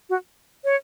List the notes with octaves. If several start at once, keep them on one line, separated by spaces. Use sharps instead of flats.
F#4
C#5